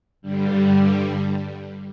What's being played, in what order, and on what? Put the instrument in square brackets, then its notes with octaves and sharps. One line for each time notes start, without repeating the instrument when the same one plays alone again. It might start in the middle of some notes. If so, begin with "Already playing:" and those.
[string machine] G2 D3 G3